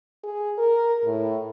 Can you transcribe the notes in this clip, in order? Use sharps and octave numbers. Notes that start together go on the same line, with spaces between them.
G#4
A#4
A2